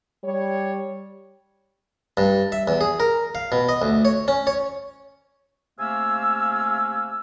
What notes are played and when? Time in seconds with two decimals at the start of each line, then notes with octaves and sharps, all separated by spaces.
0.24 G3 C#5
2.17 G2
2.52 E5
2.68 E2
2.81 G#4
3.00 A#4
3.35 F5
3.52 B2
3.69 D#5
3.82 D2
4.05 C#5
4.28 C#4
4.47 C#5
5.79 C3 A3 A#3 F5 G#5 E6